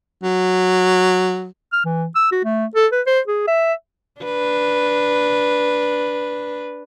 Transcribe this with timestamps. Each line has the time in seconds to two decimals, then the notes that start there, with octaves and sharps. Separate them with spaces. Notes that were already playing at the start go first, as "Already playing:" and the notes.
0.23 F#3
1.73 F6
1.85 E3
2.15 E6
2.32 F#4
2.44 A3
2.75 A4
2.92 B4
3.06 C5
3.27 G#4
3.48 E5
4.21 D4 B4